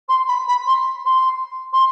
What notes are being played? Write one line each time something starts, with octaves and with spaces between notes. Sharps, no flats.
C6
B5
B5
C6
C6
C6